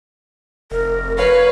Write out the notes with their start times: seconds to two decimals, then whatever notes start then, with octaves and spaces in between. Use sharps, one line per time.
0.71 F1 A#4
1.17 B4 C#5 F5